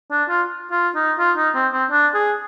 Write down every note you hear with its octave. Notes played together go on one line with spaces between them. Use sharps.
D4
F4
F4
D#4
F4
D#4
C4
C4
D4
G#4